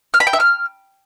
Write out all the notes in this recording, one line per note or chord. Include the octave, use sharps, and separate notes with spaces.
F6
B5
G5
E5
F6